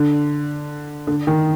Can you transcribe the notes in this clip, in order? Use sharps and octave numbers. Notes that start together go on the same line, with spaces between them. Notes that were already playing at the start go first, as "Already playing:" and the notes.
Already playing: D3
D3
D#3